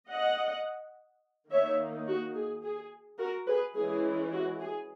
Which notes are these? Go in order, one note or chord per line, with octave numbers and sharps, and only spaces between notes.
D#5 F#5
D#3 A#3 D#4 C#5 E5
F#4
G#4
G#4
F#4 A#4
G#4 B4
E3 G#3 C#4 E4 G#4
F#4
G#4